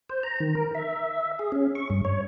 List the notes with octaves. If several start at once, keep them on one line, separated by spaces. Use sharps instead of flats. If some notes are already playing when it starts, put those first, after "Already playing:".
C5
A#5
D#3
A#4
E5
G#4
C#4
C#6
G2
C#5